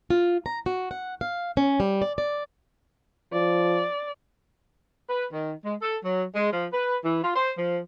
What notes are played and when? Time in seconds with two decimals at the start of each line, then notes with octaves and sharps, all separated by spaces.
0.10 F4
0.46 A#5
0.66 F#4
0.91 F#5
1.21 F5
1.57 C#4
1.80 G3
2.02 D5
2.18 D5
3.33 F3 D5
5.09 B4
5.31 D#3
5.63 G#3
5.82 A4
6.04 F#3
6.35 G#3
6.51 F3
6.72 B4
7.04 E3
7.23 F4
7.35 C5
7.58 F3